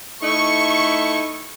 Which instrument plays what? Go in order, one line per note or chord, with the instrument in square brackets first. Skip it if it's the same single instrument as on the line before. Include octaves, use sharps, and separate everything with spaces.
[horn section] A3 D#4 E4 [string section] C#6